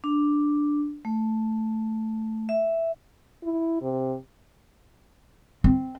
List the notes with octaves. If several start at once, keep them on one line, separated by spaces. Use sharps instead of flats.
D4
A3
E5
E4
C3
C4